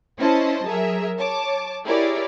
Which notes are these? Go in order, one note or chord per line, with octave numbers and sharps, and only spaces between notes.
C#4 E4 C5 D#5 A5
F#3 G#4 A#4 E5
C#5 A5 D6
E4 G4 G#4 A#4 C#5 D5